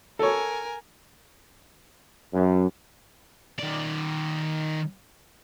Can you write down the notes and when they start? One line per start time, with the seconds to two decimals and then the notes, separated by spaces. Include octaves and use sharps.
0.19 A4 A#4 C#5 G#5
2.34 F#2
3.59 D#3 D5